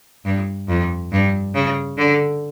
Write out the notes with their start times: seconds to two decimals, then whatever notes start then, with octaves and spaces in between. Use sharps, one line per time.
0.25 G2
0.68 F2
1.12 G2
1.54 C#3
1.97 D3